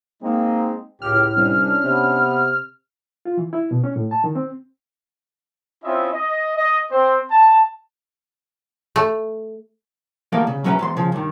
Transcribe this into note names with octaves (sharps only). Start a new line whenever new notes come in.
G#3 A#3 C4 D#4
C#2 A2 G4 F6
C2 C#4 D4
C3 B3
F4
E3
E4
B2
C#4
A2
A5
D#3
C4
C4 C#4 E4 F4 D#5 E5
D#5
D#5
C4 C5
A5
A3
E2 A2 G3 A#3 A#4 F5
C#3
F#3 G#3 C#4 B4 E5 A#5
E2 G#2 C6
C#3 F3
G2 D#3